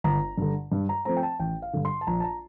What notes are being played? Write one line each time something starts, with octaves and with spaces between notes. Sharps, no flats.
G1 A#5
G2 D3
G2
A#5
F3 A3 C4 A#5
G5
A5
A1 G5
F5
G2 D3
C6
A5
A#1 A#5
A5
A#5